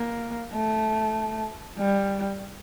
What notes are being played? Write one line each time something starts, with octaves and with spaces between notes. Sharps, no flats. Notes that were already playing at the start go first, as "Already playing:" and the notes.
Already playing: A#3
A3
G3